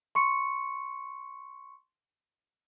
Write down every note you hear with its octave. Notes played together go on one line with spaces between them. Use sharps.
C6 C#6 C#7